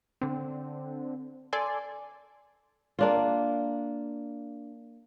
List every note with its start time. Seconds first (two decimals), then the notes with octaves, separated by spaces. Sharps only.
0.21 D3 C4
1.53 A4 D5 G#5 C6
2.99 A#3 D4 F4